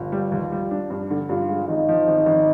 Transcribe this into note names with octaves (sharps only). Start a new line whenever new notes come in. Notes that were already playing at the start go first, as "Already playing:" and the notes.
Already playing: G1 F4
G3
D#2
G3
D4
G2
D3
G2 F4
G#3
G#1 D#4
F3
G#1
G#1